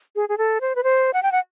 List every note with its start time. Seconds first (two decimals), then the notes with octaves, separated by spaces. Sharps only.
0.16 G#4
0.29 G#4
0.38 A4
0.61 C5
0.76 B4
0.84 C5
1.14 F#5
1.23 G5
1.32 F#5